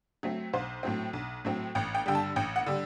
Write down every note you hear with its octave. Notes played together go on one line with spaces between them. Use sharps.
F#3 A3 C4
B1 C5
A2 F#3 C4
B1
A2 F#3 C4
A1 G5
G5
G2 D3 G3 G5
A5
A1 G5
F#5
D3 G3